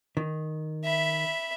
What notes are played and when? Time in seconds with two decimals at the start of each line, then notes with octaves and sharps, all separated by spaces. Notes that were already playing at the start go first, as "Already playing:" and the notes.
0.17 D#3
0.84 E5 B5